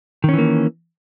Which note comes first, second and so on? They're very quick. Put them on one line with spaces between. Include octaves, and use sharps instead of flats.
D#3 C#4 E3 A#3